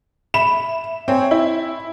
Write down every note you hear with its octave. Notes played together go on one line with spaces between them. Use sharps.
E5 B5 E7
C4 C#5 G#5
E4